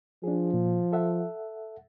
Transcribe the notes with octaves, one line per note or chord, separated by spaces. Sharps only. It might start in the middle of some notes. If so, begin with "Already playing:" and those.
F3 D4 G#4
A#2
A4 E5 F#5